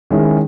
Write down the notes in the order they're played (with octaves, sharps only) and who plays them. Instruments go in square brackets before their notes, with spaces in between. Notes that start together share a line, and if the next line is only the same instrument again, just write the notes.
[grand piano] D#3 G#3 C#4 E4